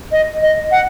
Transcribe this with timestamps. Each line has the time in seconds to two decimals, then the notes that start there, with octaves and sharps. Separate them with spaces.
0.12 D#5
0.42 D#5
0.71 F#5